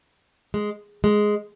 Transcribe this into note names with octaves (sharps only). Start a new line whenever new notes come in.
G#3
G#3